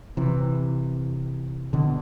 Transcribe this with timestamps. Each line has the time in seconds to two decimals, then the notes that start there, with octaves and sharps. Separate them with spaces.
0.17 C3 E3
1.73 B2 D3